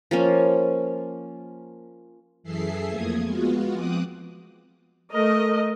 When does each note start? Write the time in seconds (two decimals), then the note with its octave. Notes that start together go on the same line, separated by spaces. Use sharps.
0.11 F3 A#3 C#4
2.43 F#2 E3 G#4 A4 E5 C7
2.90 F2 F3 A3 A#3 D#6 G#6
3.23 G#3 B3 F4 F#4
3.73 F3 C4 D6 D#6 F#6
5.13 A3 A#4 D#5